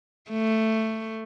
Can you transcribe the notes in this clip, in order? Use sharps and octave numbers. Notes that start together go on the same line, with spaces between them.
A3